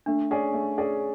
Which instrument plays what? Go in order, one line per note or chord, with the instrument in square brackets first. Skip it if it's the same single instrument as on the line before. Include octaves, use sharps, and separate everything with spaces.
[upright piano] A3 [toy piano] D4
[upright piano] C#4 G#4 D5
A3
C#4 G#4 D5